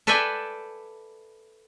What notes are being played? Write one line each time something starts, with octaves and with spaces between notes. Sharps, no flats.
A4 B4 D5 E5 G5 G#5